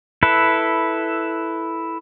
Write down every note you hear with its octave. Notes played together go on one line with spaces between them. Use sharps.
E4 A4 B4